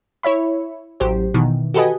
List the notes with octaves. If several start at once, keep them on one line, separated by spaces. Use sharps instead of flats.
E4 C#5 E5 B5
A1 F#3 G4 C5
B2 D#3 E3
F#4 G4 A4 B4 D#5 G#5